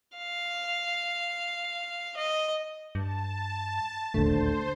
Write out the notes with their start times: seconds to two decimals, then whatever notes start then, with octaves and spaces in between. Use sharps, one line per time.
0.17 F5
2.17 D#5
2.95 G2 A5
4.14 E1 A#1 D#2 D3 A3 C5